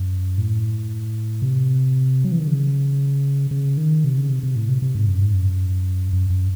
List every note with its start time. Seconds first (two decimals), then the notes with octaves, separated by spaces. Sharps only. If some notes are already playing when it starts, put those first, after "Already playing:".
Already playing: F#2
0.38 A2
1.42 C3
2.24 F#3
2.32 E3
2.39 D#3
2.47 C#3
3.51 C#3
3.77 D#3
4.04 C3
4.17 C#3
4.30 C3
4.43 C3
4.56 A2
4.69 C3
4.82 C3
4.95 G#2
5.08 F#2
5.22 G#2
5.34 F#2
6.13 F#2
6.30 F#2